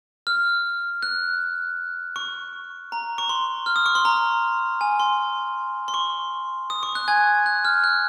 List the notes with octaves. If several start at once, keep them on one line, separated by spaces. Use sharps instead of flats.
F6
F#6
C#6
A#5
C#6
C6
F6
D#6
C#6
C6
A#5
G#5
C6
C6
C#6
D#6
C#6
F#6
G#5 G#6
F#6
F6
F#6